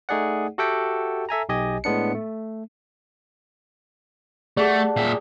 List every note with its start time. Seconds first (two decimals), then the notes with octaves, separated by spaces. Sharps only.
0.09 A3 D#4 G#4 D5 F#5
0.58 F#4 G4 A4 E5 F#5 G5
1.29 A4 E5 G#5 A#5
1.49 B1 G4 D#5 G#5
1.84 A2 G#3 B3 D4 C#7
2.15 A3
4.57 A3 G4 G#4 D5 F#5 A5
4.97 A#2 G4 G#4 E5